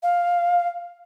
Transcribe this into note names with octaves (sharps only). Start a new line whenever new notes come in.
F5